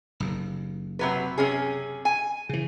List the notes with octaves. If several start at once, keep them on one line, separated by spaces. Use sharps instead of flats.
F#1 D#2
C3 F#3 B4
C3 C#4 G#4
G#5
C#3 E3